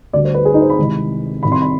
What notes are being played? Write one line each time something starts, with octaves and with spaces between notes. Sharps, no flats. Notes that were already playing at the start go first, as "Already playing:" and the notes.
D2 D3 G3 D5
C5
B4
G#4
D#4
C5
B5
C2 C3 D#3 G#3
C2 C3 D#3 G3 B5
C6
B5